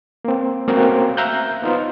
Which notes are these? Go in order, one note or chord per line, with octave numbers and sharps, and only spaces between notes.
A#3 C4
A3 A#3 C4 C#4 F#4 A#4
E5 F5 A#5 F#6 G6
B3 D#4 F4 C5